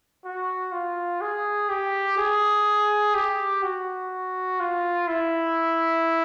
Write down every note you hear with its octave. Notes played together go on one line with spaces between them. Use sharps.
F#4
F4
G#4
G4
G#4
G4
F#4
F4
E4